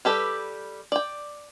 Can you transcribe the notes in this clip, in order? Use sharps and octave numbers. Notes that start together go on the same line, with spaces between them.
G3 G4 A4 B4
D5 G5